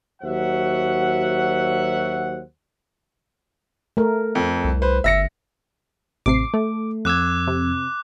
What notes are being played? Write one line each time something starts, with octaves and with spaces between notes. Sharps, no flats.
D#2 F#3 F#4 C5 E5 F#5
A3 A#4
F2
C2
B4 C5
G1 E5 A#6 C#7
A1 C3 D6 C7
A3
F2 D6 E6 F#6 G#6
C3